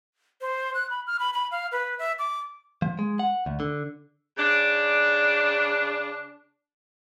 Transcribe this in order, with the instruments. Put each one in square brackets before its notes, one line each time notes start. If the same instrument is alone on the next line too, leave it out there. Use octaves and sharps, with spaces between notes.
[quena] C5
F#6
B5
F6
B5
B5
F5
B4
E5
D6
[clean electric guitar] F3
G#3
F#5
D2
D3
[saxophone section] C#3 D4